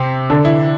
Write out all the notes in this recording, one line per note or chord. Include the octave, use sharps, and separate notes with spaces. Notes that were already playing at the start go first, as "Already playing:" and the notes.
Already playing: C3 C4
D3 D4
E3 E4